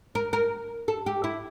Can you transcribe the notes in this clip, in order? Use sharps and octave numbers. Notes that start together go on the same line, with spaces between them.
A#4
A#4
A4
G4
E4